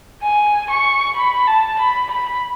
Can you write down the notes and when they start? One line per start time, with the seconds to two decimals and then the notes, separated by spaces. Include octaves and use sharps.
0.22 G#5
0.70 C#6
1.16 B5
1.47 A5
1.79 B5
2.11 B5